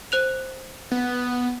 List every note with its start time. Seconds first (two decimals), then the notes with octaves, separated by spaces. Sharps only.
0.12 C5 F#6 F7
0.91 B3